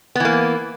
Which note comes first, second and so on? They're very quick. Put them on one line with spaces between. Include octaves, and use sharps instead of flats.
B3 E3 A#3